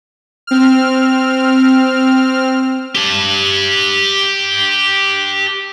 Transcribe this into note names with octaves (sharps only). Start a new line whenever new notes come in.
C4 F6
G4 A5